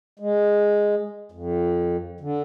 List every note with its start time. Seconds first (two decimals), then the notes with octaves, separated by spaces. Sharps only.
0.20 G#3
1.32 F2
2.21 D3